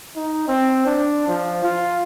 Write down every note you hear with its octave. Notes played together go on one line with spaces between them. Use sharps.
D#4
C4
D4
F3
F4